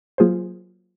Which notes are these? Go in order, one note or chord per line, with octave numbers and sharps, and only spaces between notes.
F#3 A#3 F4 G#4 C5